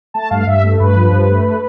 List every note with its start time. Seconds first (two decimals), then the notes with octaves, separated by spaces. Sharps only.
0.14 A3 A5
0.31 G2 F5
0.47 G2 E5
0.64 A3
0.80 G2 B4
0.96 F3
1.12 G2
1.28 A3